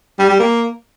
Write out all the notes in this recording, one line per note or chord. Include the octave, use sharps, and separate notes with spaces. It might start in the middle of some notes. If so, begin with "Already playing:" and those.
G3
G3
A#3